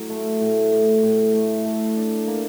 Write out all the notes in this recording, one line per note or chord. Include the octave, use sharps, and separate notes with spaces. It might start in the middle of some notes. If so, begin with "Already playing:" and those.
Already playing: A2 F#3
A3
A2
A2
A2
A3
A3
D4
A#3